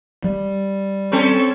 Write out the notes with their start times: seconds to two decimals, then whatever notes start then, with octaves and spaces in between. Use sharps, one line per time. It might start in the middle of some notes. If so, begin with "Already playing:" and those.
0.24 G3
1.12 C4 C#4 A4